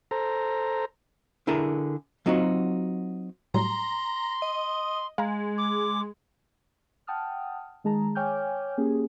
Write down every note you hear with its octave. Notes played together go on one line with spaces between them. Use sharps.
A4 C5 A#5
D3 E4 G#4 A#4 A5
F#3 C4 D#4 F4 F#4
A2 F#3 G3 A#5 C6
D#5
G#3 F5 A#5
D6
F#5 G5 A5 D#6 F6
D#3 G#3 G#4 A5 A#5
C#5 G5 G#5 D6 F6 G6
A#3 C#4 G4 G#4